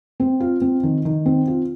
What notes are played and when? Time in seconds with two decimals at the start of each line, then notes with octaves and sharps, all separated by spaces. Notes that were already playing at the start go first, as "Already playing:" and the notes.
0.20 C4
0.40 F4
0.61 C4
0.83 D#3
1.05 D#3
1.26 C4
1.47 F4